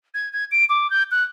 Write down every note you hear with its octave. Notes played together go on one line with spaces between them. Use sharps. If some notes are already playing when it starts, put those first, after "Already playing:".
G#6
G#6
D7
D6
G6
F#6